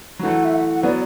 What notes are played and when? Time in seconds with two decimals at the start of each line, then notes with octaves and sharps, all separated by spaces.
0.19 F#3
0.23 E3 A3 F#5
0.45 E5
0.54 F#5
0.69 F#5
0.83 F#3 B3 D5